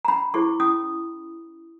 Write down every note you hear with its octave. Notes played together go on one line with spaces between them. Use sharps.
A#5
C#4 B5
E4 G#4 C5 C#6
C#4 D#6